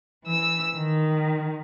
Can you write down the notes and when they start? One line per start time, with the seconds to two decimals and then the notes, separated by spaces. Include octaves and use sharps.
0.25 E3 E6
0.76 D#3